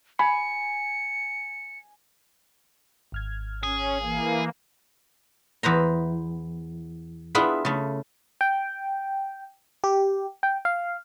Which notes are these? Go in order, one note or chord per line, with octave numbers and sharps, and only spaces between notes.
G#5 B5 C#7
G#1 F6 G#6
C#4 G#4
E3 A#3
E2 B4 C5 A#5
B3 D4 E4 F4 G#4 B4
C#3 A3
G5
G4
G5
F5